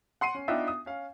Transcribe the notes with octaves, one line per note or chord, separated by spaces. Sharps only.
F#5 C6 C7 D#7
C#4
B3 D4 D#4 F4 E5 G5
D#6
C#4 F5